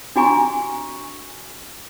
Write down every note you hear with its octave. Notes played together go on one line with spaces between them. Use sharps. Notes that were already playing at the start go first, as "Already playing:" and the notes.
D4 F#4 G#5 A#5 C#6